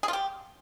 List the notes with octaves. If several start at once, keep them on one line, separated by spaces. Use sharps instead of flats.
G#4
F4
G4